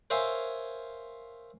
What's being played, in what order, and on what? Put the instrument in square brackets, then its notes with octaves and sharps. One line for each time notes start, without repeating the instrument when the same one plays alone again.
[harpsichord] A#4 C5 C#5 E5 F5 G#5